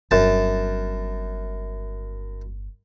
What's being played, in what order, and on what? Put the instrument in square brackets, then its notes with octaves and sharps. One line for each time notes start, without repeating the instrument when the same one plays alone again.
[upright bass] G1 [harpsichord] F#2 A5